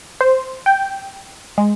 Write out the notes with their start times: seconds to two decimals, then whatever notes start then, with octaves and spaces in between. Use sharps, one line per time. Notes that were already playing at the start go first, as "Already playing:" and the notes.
0.21 C5
0.66 G5
1.58 G#3